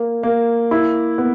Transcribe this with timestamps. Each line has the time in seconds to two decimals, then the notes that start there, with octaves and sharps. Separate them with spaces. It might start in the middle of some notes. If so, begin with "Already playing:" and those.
Already playing: A#3
0.23 A#3
0.71 E4
1.18 B3